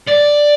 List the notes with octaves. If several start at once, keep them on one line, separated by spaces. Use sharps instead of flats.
D5